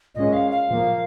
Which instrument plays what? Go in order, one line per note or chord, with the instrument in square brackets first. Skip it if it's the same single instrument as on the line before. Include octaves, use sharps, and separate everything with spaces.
[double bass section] A#2 G#3 C#4 [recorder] D#5
[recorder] F5
F5
[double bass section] A#2 F3 A#3